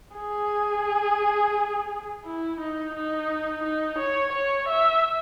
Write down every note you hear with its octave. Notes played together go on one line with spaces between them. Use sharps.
G#4
E4
D#4
D#4
D#4
C#5
C#5
E5